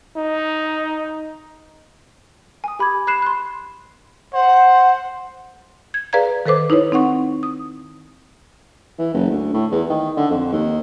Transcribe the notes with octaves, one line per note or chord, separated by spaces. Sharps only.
D#4
G#5 D#6
G4 B5 D6 G#6
B5 F#6 C7 E7
C6 F#6
C5 F#5
G#6
G#4 B4 D5 F5 A#5 G#6
D#3 A4 B4 C5 D6
D#4 E4 B4 C#5
C4 D#4 F#5 C#6
D#6
E3
F#1
D2
A2
E2
D#3
D3
F2
D#2